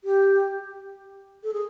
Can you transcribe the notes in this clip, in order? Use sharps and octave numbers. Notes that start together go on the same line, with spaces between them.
G4
A4
G#4